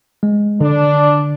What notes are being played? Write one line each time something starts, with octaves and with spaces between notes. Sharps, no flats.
G#3
D3 D4